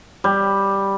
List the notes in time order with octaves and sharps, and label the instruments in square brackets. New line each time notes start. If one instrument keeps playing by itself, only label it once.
[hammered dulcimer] G3